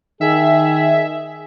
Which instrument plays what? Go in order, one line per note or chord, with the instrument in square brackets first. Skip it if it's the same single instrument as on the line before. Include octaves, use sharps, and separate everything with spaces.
[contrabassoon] D#3 [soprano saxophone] G#4 [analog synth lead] E5